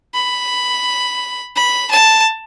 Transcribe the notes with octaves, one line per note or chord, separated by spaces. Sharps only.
B5
B5
A5